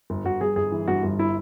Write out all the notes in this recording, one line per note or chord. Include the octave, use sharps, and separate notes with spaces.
G1
G1 F#4
G2 G#4
G1 G#4
E3
G2 F#4
G1
E4